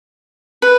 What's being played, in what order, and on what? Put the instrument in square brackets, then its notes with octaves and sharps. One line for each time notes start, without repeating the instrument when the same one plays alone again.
[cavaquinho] B4